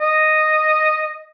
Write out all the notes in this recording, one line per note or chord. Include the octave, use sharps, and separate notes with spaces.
D#5